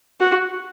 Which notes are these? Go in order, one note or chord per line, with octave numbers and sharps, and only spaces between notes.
F#4